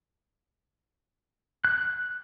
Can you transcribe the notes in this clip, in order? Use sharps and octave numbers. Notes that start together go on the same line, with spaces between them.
F#6